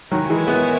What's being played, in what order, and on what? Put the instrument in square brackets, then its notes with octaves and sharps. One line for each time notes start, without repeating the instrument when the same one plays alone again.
[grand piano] D#3 F#3 [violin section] E4 A#4 C#5 G#5
[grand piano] E3 G#3
G#3 B3